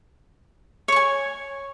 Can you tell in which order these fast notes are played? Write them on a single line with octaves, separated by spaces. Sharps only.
C#5 C#6 G#5